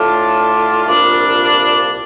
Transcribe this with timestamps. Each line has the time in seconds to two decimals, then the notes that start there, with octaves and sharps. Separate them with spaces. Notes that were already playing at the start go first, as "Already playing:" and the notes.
Already playing: A2 A3 D4 F4
0.85 C2 A#2 G3 D4 F4